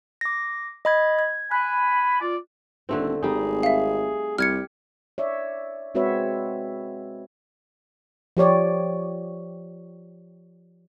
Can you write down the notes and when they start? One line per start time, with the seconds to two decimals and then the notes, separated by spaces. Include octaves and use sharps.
0.21 D6 A#6
0.85 D#5 B5 G#6
1.19 G#6
1.51 G#5 B5 F#6
2.21 F4 D5
2.89 D#1 D3 A3 C4
3.23 G#1 G3 D#4 G#4
3.63 E5 F5
4.38 C2 G3 G4 F6 G#6 C#7
5.18 C#5 D5 E5
5.95 G#3 C4 F#4 B4 C#5 E5
8.37 F3 G4 C#5 D5